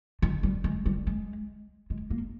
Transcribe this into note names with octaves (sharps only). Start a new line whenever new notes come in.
D#3
G3
G#3
G3
G#3
G#3
A#3